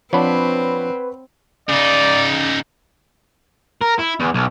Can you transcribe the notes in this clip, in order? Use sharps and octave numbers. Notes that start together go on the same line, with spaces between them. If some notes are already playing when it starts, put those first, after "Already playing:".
F3 C4 D4 B4 C#5 F#5 B5
C#3 D#4 D5
A#4
E4
E2
B1